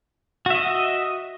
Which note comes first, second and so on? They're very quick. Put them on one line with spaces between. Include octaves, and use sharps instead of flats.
F#4 E5 D#5